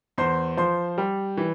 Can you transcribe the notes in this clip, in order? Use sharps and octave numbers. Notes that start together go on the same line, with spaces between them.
E2 C5 C6
F3 C5 C6
G3
E3